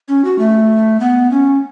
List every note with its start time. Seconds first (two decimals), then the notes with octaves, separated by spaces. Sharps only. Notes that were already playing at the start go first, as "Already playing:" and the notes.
0.08 C#4
0.25 F#4
0.39 A3
1.00 B3
1.31 C#4